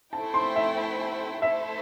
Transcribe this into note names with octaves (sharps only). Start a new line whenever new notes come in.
A3 E4 C5 G5 A5
C6
E5
A3 E4 A4 C5 E5